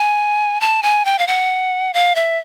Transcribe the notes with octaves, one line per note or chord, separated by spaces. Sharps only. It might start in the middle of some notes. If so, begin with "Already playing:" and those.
Already playing: G#5
A5
G#5
G5
F5
F#5
F5
E5